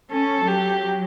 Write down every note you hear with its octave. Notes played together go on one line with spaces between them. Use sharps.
C#4 A4
F#3 G4